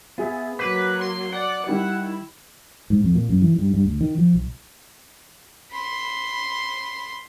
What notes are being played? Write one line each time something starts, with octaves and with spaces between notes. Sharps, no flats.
B3 F4 G#4 E5
F#3 A#3 B4 D6 B6
C6
D5 F#5
D#3 G3 E4
G#2
F2
A#2
F#2
E3
G2
G2
D2
D#3
F3
B1
B5 C6